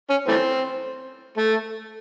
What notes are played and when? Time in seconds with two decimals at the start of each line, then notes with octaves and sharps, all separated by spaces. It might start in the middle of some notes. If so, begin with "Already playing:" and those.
0.10 C#4
0.28 E3 A3 C4
1.38 A3